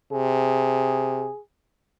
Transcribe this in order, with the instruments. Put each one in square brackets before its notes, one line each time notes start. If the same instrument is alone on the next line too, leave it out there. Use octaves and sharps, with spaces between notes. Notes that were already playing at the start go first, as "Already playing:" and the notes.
[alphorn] C3 [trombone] G#4